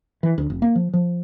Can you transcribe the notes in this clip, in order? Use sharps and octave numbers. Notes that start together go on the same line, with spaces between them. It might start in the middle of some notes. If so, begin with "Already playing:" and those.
E3
D2
F1
A#3
F3
F3